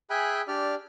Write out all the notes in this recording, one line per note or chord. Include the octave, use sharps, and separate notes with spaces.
G#4 E5 G5 G#5 B5 F#6
D4 G4 D5 F6